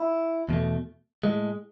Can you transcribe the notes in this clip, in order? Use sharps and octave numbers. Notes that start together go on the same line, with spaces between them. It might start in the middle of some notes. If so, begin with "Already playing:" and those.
Already playing: E4
E2 B2 A3
A2 G#3